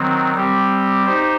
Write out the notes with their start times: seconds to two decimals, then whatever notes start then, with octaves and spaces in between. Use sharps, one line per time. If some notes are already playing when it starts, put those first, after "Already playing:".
Already playing: D#3 F#3 C4
0.35 G3 C4 G4
1.06 D#4 G4 C5